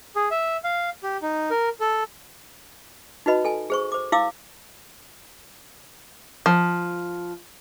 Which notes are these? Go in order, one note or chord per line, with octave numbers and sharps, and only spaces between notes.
G#4
E5
F5
G4
D#4
A#4
A4
D#4 F#4 B4 D#5 B5
A4 G#5
G#4 C5 C#6
C5 D6
E4 F5 D6 E6
F3